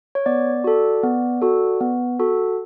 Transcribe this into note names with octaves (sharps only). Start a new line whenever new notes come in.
C#5
B3 D5
F#4 A4
B3
F#4 A4
B3
F#4 A4